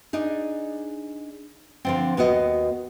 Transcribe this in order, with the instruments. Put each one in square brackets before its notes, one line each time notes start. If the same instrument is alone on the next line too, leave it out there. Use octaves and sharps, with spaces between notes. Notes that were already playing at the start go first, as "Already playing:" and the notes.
[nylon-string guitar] D4 D#4 G#4
D3 F3 C4
D#2 B3 F#4 D#5